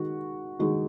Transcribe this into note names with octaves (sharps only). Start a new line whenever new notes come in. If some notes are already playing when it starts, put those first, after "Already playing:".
Already playing: D#3 G#3 D#4 F#4
D#3 G#3 D#4 F#4